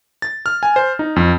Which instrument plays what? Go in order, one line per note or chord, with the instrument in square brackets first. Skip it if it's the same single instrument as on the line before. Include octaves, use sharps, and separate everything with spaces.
[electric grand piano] A6
F6
G#5
C5
D#4
F2